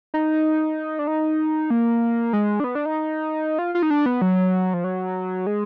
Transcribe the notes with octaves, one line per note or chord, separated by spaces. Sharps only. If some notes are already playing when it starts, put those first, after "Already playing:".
D#4
D4
D#4
A#3
G#3
D4
B3
D4
D#4
F4
F4
D#4
D4
B3
F#3
F3
F#3
G#3